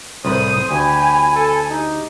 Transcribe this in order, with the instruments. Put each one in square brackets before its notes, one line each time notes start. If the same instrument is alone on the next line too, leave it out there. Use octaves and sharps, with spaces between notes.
[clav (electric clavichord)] C2 A2 B4 [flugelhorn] C5 [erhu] D#6
[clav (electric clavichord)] D2 [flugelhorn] G4 [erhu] G#5 [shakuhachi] B5
[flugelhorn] A4
[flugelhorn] D#4 [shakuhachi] G4